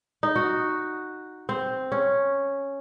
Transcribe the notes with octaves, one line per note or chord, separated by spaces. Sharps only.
D#4
F#4
C4
C#4